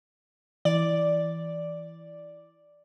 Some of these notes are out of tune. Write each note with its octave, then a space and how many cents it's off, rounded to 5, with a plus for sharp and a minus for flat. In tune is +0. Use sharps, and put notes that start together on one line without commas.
E3 +0 D5 +0